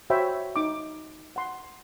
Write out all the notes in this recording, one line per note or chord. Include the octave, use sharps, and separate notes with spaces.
F#4 C5 C#5 E5 G5 B5
D#4 D6
F#5 C6